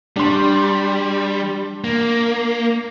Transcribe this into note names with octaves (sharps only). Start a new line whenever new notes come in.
G3 D4 C6
A#3